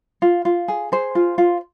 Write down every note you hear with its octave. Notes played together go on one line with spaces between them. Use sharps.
F4
F4
G#4
G#4 C5
F4
F4